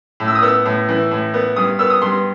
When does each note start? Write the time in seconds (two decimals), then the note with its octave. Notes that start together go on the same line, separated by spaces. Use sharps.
0.20 A2
0.28 E6
0.35 D#6
0.42 B3 E6
0.66 A2
0.89 E3
1.11 A2
1.34 B3
1.56 G2 D#6
1.79 B3 E6
1.90 D#6
2.02 G2 C6